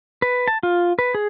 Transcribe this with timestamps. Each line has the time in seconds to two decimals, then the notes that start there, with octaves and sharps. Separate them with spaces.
0.22 B4
0.48 A5
0.63 F4
0.99 B4
1.15 G#4